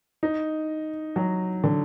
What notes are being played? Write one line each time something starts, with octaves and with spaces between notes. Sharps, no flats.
D#4
F#3
D3